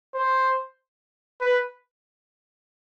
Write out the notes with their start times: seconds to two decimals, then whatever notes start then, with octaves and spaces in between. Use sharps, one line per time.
0.15 C5
1.41 B4